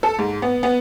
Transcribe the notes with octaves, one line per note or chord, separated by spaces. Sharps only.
A4
G#2
B3
B3